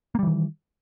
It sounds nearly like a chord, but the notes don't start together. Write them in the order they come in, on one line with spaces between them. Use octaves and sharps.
A#3 G3 E3 D#3